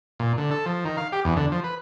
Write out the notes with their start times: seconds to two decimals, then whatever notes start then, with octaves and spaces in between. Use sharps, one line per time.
0.19 A#2
0.37 D3
0.51 A4
0.66 F3
0.85 D#3
0.97 F5
1.12 G4
1.25 E2
1.36 D3
1.52 F3
1.64 B4